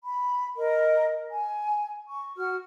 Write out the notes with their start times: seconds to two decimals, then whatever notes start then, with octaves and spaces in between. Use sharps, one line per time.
0.04 B5
0.57 A#4 D#5
1.31 G#5
2.07 C#6
2.36 F#4 F6